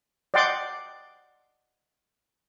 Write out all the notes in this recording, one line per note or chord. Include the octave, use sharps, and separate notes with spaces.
D5 D#5 F#5 G5 C6 D6